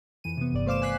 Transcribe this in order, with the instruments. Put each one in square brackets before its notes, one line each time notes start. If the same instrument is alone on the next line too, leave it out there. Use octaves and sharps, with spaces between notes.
[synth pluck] F2 E3 D#7
C3 B3
G1 G2 D5
A3 C5 F5 D6 E7
G#5 D6 F#6 B6 C7